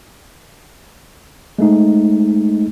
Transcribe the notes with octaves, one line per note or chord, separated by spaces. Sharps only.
G#3 A3 D#4